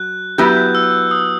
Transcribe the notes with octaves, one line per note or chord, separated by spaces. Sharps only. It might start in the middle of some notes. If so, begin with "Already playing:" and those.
Already playing: F#3 F#6
F#3 B3 E4 G4 G6
F#6
E6
F#6
E6
D#6